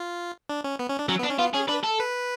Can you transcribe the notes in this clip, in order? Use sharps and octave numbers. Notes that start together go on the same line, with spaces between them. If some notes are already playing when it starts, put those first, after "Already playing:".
Already playing: F4
D4
C#4
B3
C#4
D4
F#3 C#4
B3
D4
C#4
B3 F4
C#4 G#4
D4 B4
A4
B4